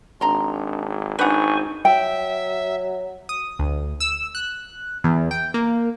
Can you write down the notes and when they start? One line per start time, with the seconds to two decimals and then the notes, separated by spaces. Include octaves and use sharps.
0.21 G#1 D4 A#5 C6
1.19 G#1 D4 D#4 B4 C5 F#5 G#5 C#6
1.85 F#3 E5 G5
3.29 D#6
3.59 D2
4.00 E6
4.35 F#6
5.04 E2
5.31 G5
5.54 A#3